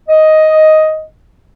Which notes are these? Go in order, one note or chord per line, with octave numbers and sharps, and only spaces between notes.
D#5